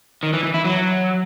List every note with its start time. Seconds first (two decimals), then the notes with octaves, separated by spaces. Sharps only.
0.23 D#3
0.33 E3
0.44 E3
0.54 E4
0.64 F#3